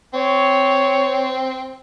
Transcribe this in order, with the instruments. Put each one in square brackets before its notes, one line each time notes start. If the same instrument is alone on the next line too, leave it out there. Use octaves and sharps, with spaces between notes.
[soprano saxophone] C4 [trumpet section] C#5